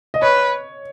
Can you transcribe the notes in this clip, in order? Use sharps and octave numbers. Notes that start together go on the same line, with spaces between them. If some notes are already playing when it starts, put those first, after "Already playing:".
D#5
B4 C#5